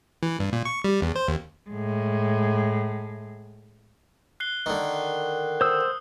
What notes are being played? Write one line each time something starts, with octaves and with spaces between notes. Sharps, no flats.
E3
G2
A#2
C#6
G3
E2
C5
D#2
A2 G#3
F#6 C7 G7
D3 D#3
C5 D#6 E6